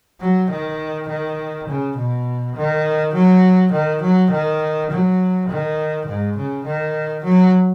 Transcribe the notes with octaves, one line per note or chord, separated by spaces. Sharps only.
F#3
D#3
D#3
C#3
B2
D#3
F#3
D#3
F#3
D#3
F#3
D#3
G#2
C#3
D#3
F#3